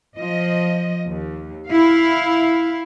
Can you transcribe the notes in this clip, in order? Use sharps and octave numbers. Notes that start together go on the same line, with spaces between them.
F3 D#5
D#2
E4 F5